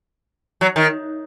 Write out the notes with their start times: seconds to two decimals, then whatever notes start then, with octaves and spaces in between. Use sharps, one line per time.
0.61 F#3
0.76 D#3